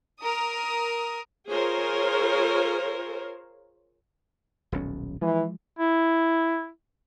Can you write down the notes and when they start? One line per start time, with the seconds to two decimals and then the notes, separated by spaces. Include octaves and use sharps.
0.20 A#4 D#6
1.48 F4 G#4 A#4 C5 C#5
4.72 D#1 B1 C#4
5.21 E3 F3 G#3
5.79 E4